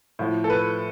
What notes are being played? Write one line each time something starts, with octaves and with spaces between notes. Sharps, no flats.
A2 F3
A4
B4